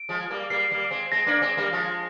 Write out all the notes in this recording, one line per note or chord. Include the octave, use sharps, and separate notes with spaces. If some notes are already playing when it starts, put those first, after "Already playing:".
Already playing: D7
F3 G#3
G3 A#3
G3 A#3 C7
G3 A#3
G#3 C4
G#3 C4 A#6
A#3 D4
G#3 C4
G3 A#3
F3 G#3